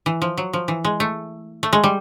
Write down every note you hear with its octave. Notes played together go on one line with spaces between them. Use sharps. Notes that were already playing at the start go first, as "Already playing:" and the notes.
E3
F3
F#3
F3
E3
G#3
A3
A3
G#3
G3